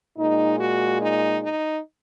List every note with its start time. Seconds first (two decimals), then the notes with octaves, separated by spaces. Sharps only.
0.18 A#2 G#3 D#4
0.59 F#4
1.00 D#4
1.42 D#4